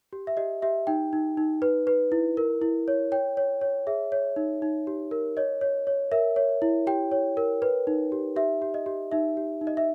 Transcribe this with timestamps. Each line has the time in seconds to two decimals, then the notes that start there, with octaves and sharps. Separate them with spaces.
0.13 G4
0.27 E5
0.37 G4 D#5
0.62 G4 E5
0.87 D#4 G5
1.13 D#4
1.37 D#4
1.62 B4
1.87 B4
2.12 E4
2.37 A#4
2.62 E4
2.88 C#5
3.12 C#5 G5
3.37 C#5
3.61 C#5
3.87 G#4 E5
4.12 C#5
4.36 D#4
4.62 D#4
4.87 G4
5.11 A#4
5.37 C#5 D#5
5.61 C#5
5.87 C#5
6.12 A#4 E5
6.36 C#5
6.62 E4
6.87 G4 G5
7.12 C#5
7.37 A#4
7.62 B4
7.87 D#4
8.12 G4
8.36 G4 E5
8.62 G4
8.74 D#5
8.86 G4
9.12 D#4 E5
9.37 G4
9.61 D#4
9.67 D#5
9.77 E5